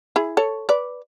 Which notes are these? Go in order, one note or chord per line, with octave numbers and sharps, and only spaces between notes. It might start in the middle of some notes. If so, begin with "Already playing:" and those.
E4 G#4
A4 C#5
B4 D5